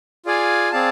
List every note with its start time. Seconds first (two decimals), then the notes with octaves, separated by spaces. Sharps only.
0.26 F4 G#4 D5 F5 G#5
0.71 C4 G#4 D5 F5 A5